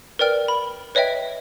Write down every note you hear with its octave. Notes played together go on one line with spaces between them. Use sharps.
A#4 B4 D5 G5 F6
B5
B4 C#5 D#5 E5 G5